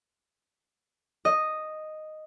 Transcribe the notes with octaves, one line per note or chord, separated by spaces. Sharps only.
D#5